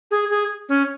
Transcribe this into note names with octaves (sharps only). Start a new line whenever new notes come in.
G#4
G#4
C#4